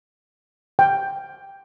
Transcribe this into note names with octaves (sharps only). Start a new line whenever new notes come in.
G5